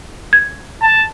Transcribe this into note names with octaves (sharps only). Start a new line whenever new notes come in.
G#6
A5